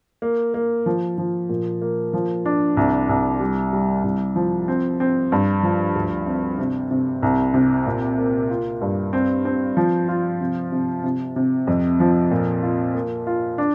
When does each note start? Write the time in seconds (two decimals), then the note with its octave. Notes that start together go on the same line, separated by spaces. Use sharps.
0.22 A#3
0.54 A#3
0.86 F3
1.18 F3
1.49 A#2
1.82 A#3
2.14 F3
2.46 D4
2.77 C2
3.09 C2
3.40 G3
3.73 G3
4.04 C2
4.36 F3
4.68 C4
5.00 C4
5.32 G2
5.63 F3
5.96 D2
6.27 C4
6.59 C3
6.91 C3
7.23 C2
7.54 C3
7.87 A#2
8.18 A#3
8.50 F4
8.81 G2
9.13 C4
9.45 C4
9.77 F3
10.08 F4
10.41 C3
10.72 C3
11.04 C3
11.36 C3
11.67 F2
12.00 F3
12.31 A#2
12.62 F4
12.95 A#3
13.27 F4
13.58 D4